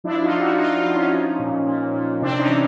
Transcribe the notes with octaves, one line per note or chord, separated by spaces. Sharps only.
F3 D4 E4
D#4 F4
F3
E4 F#4
F3 D#4 F4
D#4 F4
F3
C#4 D#4
F3
A#2
A#2
A#2
C3 C4 D4
C#4 D#4
E3